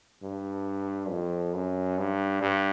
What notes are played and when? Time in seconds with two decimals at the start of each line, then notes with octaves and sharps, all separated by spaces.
0.23 G2
1.11 F2
1.55 F#2
1.98 G2
2.42 G2